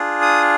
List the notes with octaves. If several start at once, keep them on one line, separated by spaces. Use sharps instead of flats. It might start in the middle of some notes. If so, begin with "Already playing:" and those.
Already playing: D4 F4 G#4
D#6